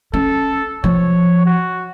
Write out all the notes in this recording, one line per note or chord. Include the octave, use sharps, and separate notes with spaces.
C#4 A4
F3 C#5
F#4